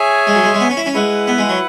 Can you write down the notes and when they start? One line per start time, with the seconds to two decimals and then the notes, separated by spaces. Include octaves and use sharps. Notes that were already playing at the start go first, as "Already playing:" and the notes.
Already playing: G#4 C#5 E5 G#5
0.27 G#3
0.36 F#3
0.44 G#3
0.54 G#3
0.60 B3
0.70 C#4
0.77 E4
0.86 C#4
0.94 G#3 E4 B4 F#5
1.28 B3
1.38 G#3
1.49 F#3